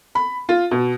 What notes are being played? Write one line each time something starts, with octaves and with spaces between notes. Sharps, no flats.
B5
F4
B2